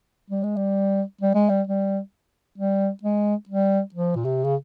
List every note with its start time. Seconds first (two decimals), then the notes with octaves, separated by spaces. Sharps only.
0.30 G3
0.43 G#3
0.56 G3
1.21 G3
1.35 G#3
1.49 G3
1.67 G3
2.58 G3
3.03 G#3
3.49 G3
3.94 F3
4.16 A#2
4.24 C3
4.44 C#3